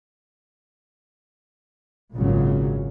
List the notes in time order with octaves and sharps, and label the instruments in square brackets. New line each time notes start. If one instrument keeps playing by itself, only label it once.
[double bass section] G#1 A#2 C#3 F#3